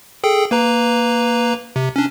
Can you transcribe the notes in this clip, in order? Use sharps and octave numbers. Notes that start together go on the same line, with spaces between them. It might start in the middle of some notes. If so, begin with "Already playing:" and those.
G#4 A4 G5
A#3 B4 A#5
C3
C#4 D4